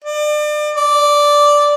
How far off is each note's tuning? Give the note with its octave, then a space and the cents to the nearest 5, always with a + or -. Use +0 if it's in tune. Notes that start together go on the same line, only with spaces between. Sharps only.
D5 +35
D5 -5